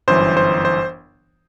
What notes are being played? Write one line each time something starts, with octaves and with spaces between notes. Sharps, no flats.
G1 F#2 E3 C5
C5
C5